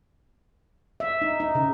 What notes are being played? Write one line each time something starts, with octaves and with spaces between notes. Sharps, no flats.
E5
D#4
D#4
C#3